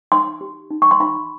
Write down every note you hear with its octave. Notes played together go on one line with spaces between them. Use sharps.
D#4 C6
G4
D#4
C#6
C6
D#4 B5